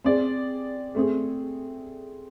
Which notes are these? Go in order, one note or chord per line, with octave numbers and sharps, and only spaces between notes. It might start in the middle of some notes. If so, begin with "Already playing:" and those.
C4 G#4 D5
A3 C4 G#4